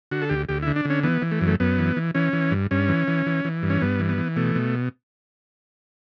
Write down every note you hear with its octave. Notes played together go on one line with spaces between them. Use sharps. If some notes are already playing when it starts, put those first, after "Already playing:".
D3 F#4
A4
D2 G4
D2 G4
D3 E4
D4
D3
C#4
E3 B3
E3
A3
F#2
A3
F#2 B3
E3
E3
E3 C#4
E3
G2
G2 C#4
E3
E3
E3
E3
G2
C#4
G2 B3
E3
B3
E3
B2 A3
B2